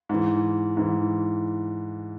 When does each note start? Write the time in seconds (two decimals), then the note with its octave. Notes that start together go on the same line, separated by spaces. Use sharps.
0.09 G#2 E3
0.77 G#2 E3